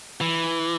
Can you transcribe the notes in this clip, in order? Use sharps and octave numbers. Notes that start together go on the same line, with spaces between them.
E3